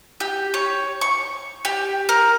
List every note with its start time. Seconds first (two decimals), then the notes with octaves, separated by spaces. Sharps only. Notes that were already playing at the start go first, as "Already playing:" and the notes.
0.20 G4
0.54 C#5
1.01 C#6
1.65 G4
2.09 A#4